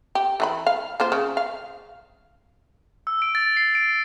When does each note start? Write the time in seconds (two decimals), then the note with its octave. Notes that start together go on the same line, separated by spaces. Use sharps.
0.15 G4
0.40 E3 G#4 B5
0.67 F5
1.00 A#3 F4 C5
1.12 C#3
1.37 F5
3.07 E6
3.22 D7
3.35 A6
3.57 C7
3.75 D7